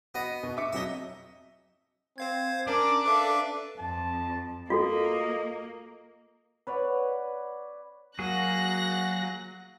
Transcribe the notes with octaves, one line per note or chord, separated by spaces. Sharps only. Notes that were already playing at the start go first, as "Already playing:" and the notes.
B3 F#4 D#5
B2
E5 D6 C#7
F2 F#3 D#4 E5 G7
C4 C5 F5 G#6
C#4 D4 A#4 D6
A4 B4 E5 F5
F2 A5
A#3 F4 F#4 A4 D#5
B4 C#5 D5 F#5
F#3 A#3 F#4 G#4 F#6 A#6